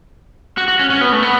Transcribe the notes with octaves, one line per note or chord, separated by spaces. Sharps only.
F#4
F#4
C#4
C#4
B3
A3
B3